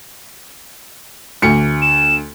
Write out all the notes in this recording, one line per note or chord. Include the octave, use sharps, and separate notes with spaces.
D2 C#7
E7